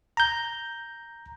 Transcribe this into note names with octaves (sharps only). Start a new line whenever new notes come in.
A#5 G6